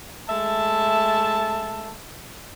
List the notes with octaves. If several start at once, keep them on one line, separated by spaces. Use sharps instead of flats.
G#3 A3 E5 A5